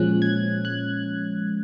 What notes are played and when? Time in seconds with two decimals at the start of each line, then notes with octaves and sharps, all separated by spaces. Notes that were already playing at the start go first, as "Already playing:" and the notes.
Already playing: A#2 F3 G#3 C#4 F#6
0.22 G#6
0.65 F#6